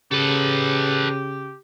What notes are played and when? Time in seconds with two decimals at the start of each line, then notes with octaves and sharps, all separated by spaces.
0.11 C#3 G4 A4 B4